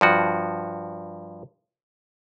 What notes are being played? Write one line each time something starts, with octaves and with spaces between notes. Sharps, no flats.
G2 F3 F#4